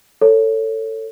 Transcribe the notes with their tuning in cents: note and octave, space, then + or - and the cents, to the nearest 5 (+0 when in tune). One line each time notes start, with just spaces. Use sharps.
A4 +20 C#5 +0